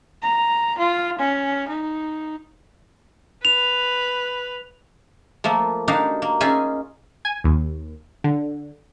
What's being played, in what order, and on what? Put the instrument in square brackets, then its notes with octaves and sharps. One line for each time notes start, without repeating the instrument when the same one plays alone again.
[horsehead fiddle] A#5
F4
C#4
D#4
[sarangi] B4 [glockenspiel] F7
[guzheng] F3 A3 A#3
D4 D#4 F#4 G4 F5
A#3
C#4 D#4 F4 G#4 E5 G#5
[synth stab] G#5
D#2
D3